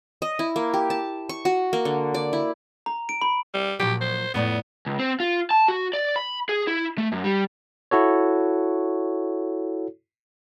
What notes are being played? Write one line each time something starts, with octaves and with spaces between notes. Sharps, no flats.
D#5
E4
A#3
G4
A5
C#6
F#4
A#3
D3
D5
E4
A#5
D7
B5
G3
A#2 F3 F#3 G4
C5
F2 A2 B3 D5
C#2
C4
F4
A5
F#4
D5
B5
G#4
E4
A3
F#2
G3
E4 F#4 A4 C#5